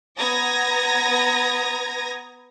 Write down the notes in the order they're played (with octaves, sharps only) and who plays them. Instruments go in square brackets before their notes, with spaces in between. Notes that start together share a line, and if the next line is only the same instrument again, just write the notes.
[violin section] B3 A#5 D#6 G#6 A#6